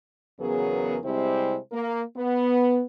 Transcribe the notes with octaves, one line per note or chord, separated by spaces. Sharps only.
E2 C#3 F#3 B3 G#4 A#4
C3 G3 G#3 C4 E4 C5
A#3
B3